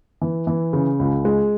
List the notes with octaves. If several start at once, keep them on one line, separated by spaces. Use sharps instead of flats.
E3
E3
C#3
C#2
G#3